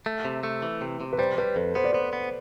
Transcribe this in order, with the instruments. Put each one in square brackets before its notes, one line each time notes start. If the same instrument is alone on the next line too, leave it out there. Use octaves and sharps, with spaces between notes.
[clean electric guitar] A3
C3
A3
E3
C3
C3
[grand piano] B4
[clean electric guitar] G3 [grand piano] C5
[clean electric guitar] G3 [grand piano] B4
[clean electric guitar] F2 [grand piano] A4
[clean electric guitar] B3 [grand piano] C5
[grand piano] D5
[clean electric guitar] B3 [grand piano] C5
[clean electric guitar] B3